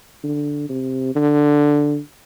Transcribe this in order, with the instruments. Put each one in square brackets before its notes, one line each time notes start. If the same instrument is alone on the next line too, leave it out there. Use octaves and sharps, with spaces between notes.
[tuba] D3
C3
D3